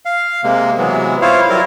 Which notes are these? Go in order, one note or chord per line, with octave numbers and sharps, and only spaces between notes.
F5
C3 G#3 A#3
C3 E3 F#3 G#3 B3
E4 F4 C5 C#5 F5
F#3 G3 E4 F4 A#4